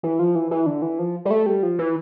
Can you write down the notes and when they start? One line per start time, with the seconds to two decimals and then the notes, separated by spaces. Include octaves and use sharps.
0.03 E3
0.19 F3
0.35 E3
0.51 E3
0.66 D3
0.82 E3
0.99 F3
1.25 G3
1.31 A3
1.46 G3
1.63 F3
1.79 E3